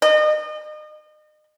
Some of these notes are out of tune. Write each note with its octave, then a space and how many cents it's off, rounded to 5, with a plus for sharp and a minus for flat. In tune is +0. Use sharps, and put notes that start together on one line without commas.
D#5 -35